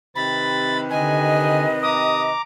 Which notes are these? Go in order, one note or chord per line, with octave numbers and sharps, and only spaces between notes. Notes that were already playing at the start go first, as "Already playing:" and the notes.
C3 D#3 B4 B5 A6
D3 D#5 G#5
A#5 D6 D#6